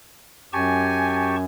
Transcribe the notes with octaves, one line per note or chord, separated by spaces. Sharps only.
F#2 G4 G#5 A5 C#6